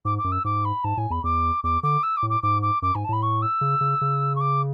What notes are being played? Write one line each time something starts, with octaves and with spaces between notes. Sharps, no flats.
G#2 D6
D6
F#2
E6
G#2 D6
B5
G#2 A5
A2 G#5
E2 B5
E2 D6
E2 D6
D3 D6
E6
D6
A2
D6
G#2 D6
D6
F#2 D6
G#2 G#5
A5
A2 B5
C#6
E6
C#3
C#3
C#3
C#6
D6